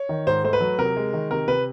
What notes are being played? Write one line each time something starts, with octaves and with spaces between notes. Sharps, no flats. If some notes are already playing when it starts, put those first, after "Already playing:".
Already playing: C#5
D#3
G#2 C5
A3 C5
B4
F#3
C3 A#4
G#3
D#3
C3 A#4
C3 B4